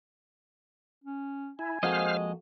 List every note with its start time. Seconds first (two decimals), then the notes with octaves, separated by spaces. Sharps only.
1.04 C#4
1.59 E4 G#5
1.83 F2 G#3 A#3 F#4 C5 D#5 F5 F6